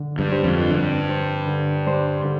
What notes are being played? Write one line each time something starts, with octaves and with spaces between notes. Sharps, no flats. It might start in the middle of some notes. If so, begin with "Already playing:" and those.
Already playing: D3
G2
G3 D4 G4 C5
F2
G2 D3
G3 D4 G4 C5
D3
G3 D4 G4 C5
D3